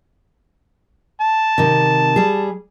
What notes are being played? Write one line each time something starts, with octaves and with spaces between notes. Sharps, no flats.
A5
C3 D#3
G3 G#4